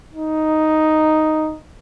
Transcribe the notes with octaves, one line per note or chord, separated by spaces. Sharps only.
D#4